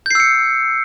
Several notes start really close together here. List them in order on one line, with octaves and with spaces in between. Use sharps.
G6 C7 E6 C#7